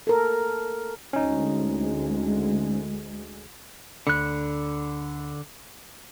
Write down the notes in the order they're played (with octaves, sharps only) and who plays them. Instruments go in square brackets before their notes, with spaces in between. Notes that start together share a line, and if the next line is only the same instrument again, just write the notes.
[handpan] A4 A#4
[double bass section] D2 G#3 [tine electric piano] C#4 D#4
[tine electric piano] D2 B5 C#7 [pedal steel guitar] D3 F#6